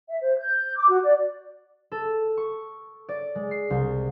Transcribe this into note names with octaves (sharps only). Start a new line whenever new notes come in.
E5
C5
G6
D6
F#4
D5
A4
C#6
D5
G#3
C7
C2